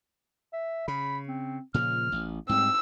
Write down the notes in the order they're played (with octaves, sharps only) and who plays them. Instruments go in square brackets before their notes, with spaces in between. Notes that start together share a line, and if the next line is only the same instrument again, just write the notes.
[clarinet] E5
[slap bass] C#3 [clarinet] B5
[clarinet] C4
[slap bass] A#2 C#3 F3 [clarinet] F6
[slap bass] A1
[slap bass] G#2 G3 [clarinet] C4 [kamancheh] E6